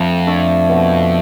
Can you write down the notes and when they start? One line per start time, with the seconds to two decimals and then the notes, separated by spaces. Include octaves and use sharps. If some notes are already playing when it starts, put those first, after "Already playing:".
Already playing: F2 F3 A3 D4
0.27 A3 D4
0.69 B2